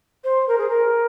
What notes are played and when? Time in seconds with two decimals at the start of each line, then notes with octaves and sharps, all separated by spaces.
0.24 C5
0.48 A#4
0.58 G#4
0.70 A#4